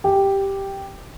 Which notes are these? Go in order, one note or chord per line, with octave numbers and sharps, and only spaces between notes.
G4